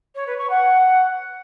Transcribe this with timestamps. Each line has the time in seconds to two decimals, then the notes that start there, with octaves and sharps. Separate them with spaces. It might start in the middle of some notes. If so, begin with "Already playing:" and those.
0.15 C#5
0.27 B4
0.38 C#6
0.49 F#5